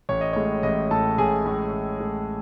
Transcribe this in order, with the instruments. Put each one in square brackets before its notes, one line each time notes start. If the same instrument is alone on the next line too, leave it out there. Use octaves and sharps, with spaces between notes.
[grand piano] A1 C#5
D#5
A2 G#3 C#5
A1 D#5
A2 G#3 A4 A5
A1 G#4 G#5
A2 G#3
A1
A2 G#3